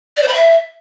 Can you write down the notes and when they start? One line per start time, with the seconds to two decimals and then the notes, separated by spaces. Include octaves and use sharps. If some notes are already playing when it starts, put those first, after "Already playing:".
0.17 D5
0.22 C5
0.28 B5
0.34 E5